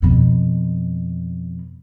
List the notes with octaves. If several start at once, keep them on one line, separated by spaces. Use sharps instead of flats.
F2 B2